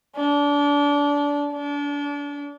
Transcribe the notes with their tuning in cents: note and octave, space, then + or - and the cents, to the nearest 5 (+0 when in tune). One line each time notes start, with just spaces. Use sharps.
D4 -25
D4 -35